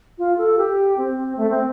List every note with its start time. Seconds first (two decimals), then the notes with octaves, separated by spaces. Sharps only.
0.18 F4
0.38 A4
0.58 G4
0.97 C4
1.37 A3
1.50 C4